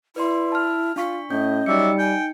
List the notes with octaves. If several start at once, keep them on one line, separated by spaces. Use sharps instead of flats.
E4 B4 D5 C6
A5 F6
D4 F4 C#6 B6
A2 C#4 D#5 G6
F#3 G3 D#4 D5 E5 C#7
G5 G#5